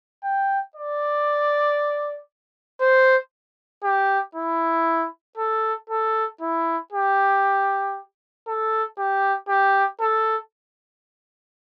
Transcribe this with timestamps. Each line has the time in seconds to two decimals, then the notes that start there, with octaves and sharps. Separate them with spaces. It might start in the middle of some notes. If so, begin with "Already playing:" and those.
0.24 G5
0.76 D5
2.81 C5
3.83 G4
4.35 E4
5.37 A4
5.90 A4
6.41 E4
6.92 G4
8.47 A4
8.98 G4
9.49 G4
10.00 A4